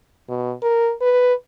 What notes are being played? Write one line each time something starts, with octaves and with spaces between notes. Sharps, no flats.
B2
A#4
B4